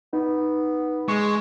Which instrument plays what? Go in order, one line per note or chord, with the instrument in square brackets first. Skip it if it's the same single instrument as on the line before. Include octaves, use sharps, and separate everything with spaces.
[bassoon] B3 [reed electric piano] D#4
[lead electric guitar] G#3 [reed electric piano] C#6